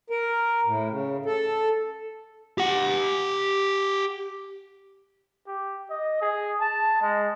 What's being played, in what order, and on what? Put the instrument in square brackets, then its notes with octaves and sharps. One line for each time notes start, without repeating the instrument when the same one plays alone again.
[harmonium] A#4
A2
C#3
A4
[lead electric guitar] G4 F#5
[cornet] G4
D#5
G#4
A5
G#3